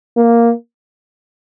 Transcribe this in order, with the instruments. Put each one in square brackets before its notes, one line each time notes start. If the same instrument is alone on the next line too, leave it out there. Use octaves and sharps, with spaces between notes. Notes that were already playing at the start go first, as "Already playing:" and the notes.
[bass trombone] A#3